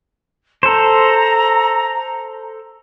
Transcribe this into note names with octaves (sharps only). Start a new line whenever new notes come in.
A4 C5 A#5